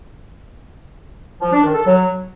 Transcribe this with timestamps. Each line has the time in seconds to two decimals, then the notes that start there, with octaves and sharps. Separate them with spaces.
1.41 F3
1.53 D4
1.64 D#3
1.75 A4
1.86 F#3